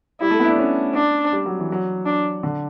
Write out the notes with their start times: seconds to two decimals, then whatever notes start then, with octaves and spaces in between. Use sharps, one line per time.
0.21 G3 E4
0.30 A3
0.40 B3
0.44 E4
0.49 D4
0.58 C#4
0.95 D4
1.33 G3
1.46 F#3
1.59 E3
1.72 F#3
2.06 D4
2.43 D3